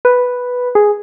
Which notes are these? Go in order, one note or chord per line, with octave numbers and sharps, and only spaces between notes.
B4
G#4